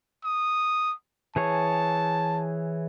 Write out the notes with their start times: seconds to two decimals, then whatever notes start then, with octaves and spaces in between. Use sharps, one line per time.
0.25 D#6
1.36 E3 G#4 C#5 A5